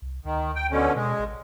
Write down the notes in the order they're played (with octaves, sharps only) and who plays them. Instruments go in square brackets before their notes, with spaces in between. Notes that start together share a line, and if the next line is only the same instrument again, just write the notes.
[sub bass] C2
[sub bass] D2 [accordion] D#3
[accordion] G5
B2 D3 C#4
[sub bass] B2 [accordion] G#3
[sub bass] A1